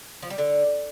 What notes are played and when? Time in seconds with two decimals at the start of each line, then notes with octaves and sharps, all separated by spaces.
0.22 F3
0.30 G3
0.38 D3